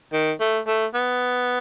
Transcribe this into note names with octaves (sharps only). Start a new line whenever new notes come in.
D#3
A3
A3
B3